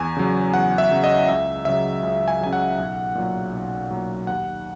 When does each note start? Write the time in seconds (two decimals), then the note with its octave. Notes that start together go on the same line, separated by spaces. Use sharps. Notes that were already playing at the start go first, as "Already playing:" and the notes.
Already playing: E2 G#5
0.17 C#3 F#3
0.53 E2 F#5
0.78 E5
0.91 C#3 F#3
1.04 D#5
1.28 C#2 E5
1.65 C#3 F#3 E5
2.03 C#2
2.28 G#5
2.41 C#3 F#3 G#5
2.53 F#5
2.78 B1
3.15 A#2 F#3
3.53 B1
3.91 A#2 F#3
4.27 D#2 F#5